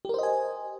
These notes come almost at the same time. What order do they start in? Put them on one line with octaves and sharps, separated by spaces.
G4 A#4 C5 D#5 G#5